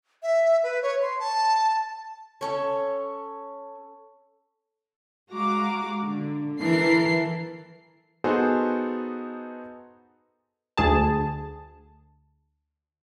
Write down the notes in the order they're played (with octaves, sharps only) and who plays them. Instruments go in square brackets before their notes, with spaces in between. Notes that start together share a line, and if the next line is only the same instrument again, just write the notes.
[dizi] E5
B4
C#5
C6
A5
[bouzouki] C#4 A4 C#5
[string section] G#3 F#4 F5 A#5 D6
D3
E3 A4 A#4 C7
[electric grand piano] B3 D#4 F#4 G#4 A4 C5
[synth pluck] D2 G#4 A5